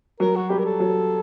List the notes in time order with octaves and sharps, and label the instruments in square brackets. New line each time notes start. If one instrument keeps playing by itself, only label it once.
[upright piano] F#3 [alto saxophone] A#4
[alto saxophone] F#4
[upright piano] G3 [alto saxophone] G4
[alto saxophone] A#4
A4
[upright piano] F#3